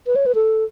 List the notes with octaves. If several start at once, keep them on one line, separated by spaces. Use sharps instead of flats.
B4
C#5
B4
A4